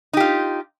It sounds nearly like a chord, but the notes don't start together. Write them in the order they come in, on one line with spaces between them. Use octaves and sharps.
D#4 G4 F4